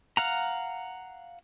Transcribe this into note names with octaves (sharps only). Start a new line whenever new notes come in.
F5 F#5 A#5